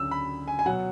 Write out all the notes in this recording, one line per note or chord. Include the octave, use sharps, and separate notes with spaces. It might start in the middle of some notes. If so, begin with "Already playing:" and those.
Already playing: D2 C#3 F#3 E6
B5
G#5
G#5
B2 F#3 F#5